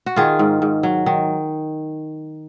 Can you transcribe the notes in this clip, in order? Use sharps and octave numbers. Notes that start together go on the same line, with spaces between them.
F#4
D#3 F4 G#4
G#2
G#2
F#3
D#3